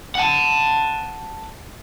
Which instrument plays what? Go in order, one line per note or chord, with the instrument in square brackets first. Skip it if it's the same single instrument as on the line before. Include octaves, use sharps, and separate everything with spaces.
[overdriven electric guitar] F#5 A5